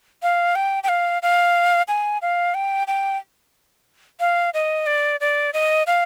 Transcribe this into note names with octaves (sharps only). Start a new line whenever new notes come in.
F5
G5
G5
F5
F5
G#5
F5
G5
G5
F5
D#5
D5
D5
D#5
F5